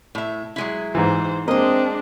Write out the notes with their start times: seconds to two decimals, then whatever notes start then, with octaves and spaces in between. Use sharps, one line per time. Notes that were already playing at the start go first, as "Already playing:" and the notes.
0.15 A2 E5
0.56 F#3 G#3 E4
0.95 G#2 E3 C5
1.48 G#3 A#3 C4 D4 C5 D#5